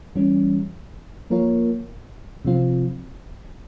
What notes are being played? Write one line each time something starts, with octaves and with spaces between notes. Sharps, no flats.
E3 G3 C#4
F3 A#3 F4 A#4 C#5
C3 F3 C4 F4